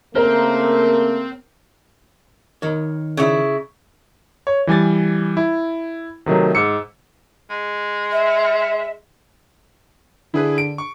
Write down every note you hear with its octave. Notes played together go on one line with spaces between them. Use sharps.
C#3 A3 A#3 C4 A#4 C5 A#5
D#3 C#5
C#3 E4
C#5
E3 G3 G#5 A6
E4
C3 D#3 F#3 A3
G#2 E6 C#7
G#3
E5
D3 E4 G#4 B4
D7
C#6